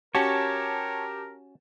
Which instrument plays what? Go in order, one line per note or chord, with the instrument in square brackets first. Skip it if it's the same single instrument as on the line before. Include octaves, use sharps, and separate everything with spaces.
[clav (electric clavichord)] C#4 F#4 [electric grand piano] G4 A5 [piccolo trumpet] A#4 [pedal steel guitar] C#5